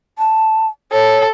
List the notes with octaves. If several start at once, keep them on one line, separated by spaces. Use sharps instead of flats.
A5
A4 C#5